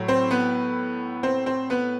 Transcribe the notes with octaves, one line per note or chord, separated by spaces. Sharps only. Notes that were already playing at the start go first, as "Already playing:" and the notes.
Already playing: A2 F#3
C4 C5
B3 B4
C4 C5
C4 C5
B3 B4